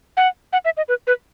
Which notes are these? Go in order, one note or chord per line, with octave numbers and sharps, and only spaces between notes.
F#5
F#5
E5
D#5
B4
B4